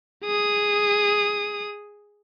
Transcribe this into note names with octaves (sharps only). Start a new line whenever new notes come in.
G#4 D#6